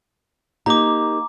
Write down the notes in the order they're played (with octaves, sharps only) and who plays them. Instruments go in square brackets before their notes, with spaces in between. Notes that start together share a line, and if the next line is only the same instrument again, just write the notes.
[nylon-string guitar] A#3 D#4 G4 [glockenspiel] A#5 D6